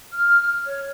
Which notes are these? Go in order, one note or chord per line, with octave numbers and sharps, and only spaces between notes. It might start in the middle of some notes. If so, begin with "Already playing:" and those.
F6
C#5